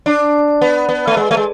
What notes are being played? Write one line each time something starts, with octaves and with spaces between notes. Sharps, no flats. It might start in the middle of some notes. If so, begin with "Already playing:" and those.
D4
B3
B3
A3
G#3
A3
G#3